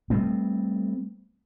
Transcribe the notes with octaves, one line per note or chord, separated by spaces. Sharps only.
G3 A3 B3 C4